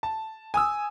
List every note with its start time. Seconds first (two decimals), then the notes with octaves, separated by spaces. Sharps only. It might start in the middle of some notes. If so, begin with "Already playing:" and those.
0.03 A5
0.54 G#5 D#6 E6